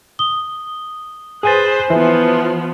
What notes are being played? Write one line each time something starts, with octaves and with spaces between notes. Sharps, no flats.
D#6 G7
G#4 B4 C5 G#5 A6
E3 F3 B3 E5